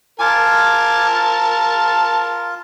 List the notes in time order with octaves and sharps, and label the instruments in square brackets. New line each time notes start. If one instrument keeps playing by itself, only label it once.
[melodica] F4 G#5 D6 [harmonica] A#4 A5
[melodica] F4